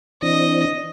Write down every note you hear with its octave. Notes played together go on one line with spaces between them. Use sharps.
E3 C4 D4 D#5